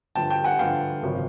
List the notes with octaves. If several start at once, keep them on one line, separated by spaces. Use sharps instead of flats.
G2 D3 F3 G5 A5
G5 A5
F#5 G#5
G2 D3 F3 F5 G5
G#1 F#2 C#3 F3